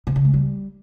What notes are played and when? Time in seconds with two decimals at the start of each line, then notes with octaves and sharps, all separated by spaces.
0.07 C3
0.16 C#3
0.25 G#3
0.34 G3